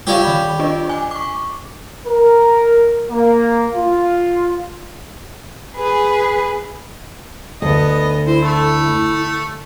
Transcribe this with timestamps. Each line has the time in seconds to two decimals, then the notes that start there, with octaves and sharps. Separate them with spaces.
0.07 G3 F4 G4 C#5 D5 F5
0.24 D#3 B5
0.59 D4 F4 D#5
0.89 G#5 D6
1.11 C#6 D6
2.06 A#4
3.10 A#3
3.74 F4
5.76 G#4 B4
7.62 D2 B3 D#5
8.26 E4 C5
8.42 A3 A4